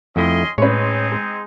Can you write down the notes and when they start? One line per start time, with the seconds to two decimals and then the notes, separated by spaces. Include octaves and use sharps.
0.16 F2 A3 C#4 E4 D#5 C6
0.58 A2 G#3 C4 C#4 D#4 G#4 B4 C#5
1.12 G#3